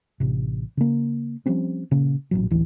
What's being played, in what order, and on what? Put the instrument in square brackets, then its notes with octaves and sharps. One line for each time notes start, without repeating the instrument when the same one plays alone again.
[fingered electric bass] A1 C3
C#3 A#3
F3 G3 C4 C#4
A#2 C#3 A#3
A1 A#2 F#3
D1 A1 E3